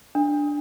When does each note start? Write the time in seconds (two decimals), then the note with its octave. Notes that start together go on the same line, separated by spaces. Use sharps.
0.15 D4